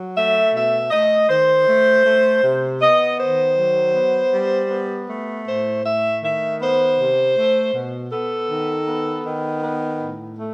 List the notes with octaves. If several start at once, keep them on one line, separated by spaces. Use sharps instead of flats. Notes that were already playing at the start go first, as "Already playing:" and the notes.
Already playing: F#3
A3 E5
B2 E5
A3 D#5
D#3 C5
A3
A3
C3
B3 D#5
D#3 C5
F#3
B3
G3
B3
A3
A2 C5
A3 E5
D#3 E5
B3 C5
C3
A3
B2
B3 A4
D#3
B3
D#3
B3
A2
A3